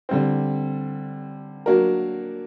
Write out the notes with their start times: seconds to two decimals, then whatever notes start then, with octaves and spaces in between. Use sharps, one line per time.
0.09 D3 G3 C4
1.66 F#3 A#3 D4 F#4 A#4